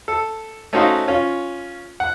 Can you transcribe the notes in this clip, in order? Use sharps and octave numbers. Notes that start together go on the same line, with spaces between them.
A4
A3 C#4 D#4 F#4 C5 F5
C#4 F4
F#5